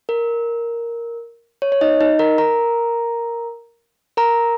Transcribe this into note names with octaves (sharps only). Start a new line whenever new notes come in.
A#4
C#5
C#5
D#4 D#5
D#4 D#5
A#4 A#5
A#4 A#5
A#4 A#5